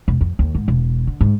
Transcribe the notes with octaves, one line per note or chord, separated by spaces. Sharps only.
E1
F2
D#2
G#2
E1
D3
G#2